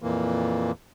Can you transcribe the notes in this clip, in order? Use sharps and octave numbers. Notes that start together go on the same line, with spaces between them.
F2 A#2 E3 A#3